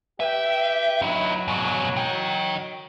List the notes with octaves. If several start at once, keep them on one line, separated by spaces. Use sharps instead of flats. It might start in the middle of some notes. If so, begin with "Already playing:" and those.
G4 B4 E5 G5
F#3 D#4 E4
G#2 B2
D#5 G5